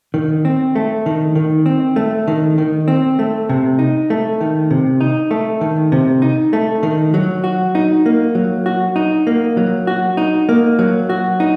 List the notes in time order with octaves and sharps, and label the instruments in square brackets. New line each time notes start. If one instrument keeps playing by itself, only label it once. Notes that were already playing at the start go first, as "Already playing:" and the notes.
[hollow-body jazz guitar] D#3
C4
A3
D#3
D#3
C4
A3
D#3
D#3
C4
A3
C3
D#4
A3
D#3
C3
D#4
A3
D#3
C3
D#4
A3
D#3
F#3
F#4
D#4
A#3
F#3
F#4
D#4
A#3
F#3
F#4
D#4
A#3
F#3
F#4
D#4